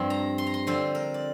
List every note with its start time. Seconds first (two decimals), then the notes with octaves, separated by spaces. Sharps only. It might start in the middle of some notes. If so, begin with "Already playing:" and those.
Already playing: G2 F3 C4
0.10 A#5
0.38 C6
0.47 A#5
0.54 C6
0.67 D3 F3 C4 C6
0.95 A#4
1.14 D5